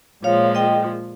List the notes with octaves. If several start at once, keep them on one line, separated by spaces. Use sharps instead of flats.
A#2 F3 G#3 C#5 F5
D#5 G5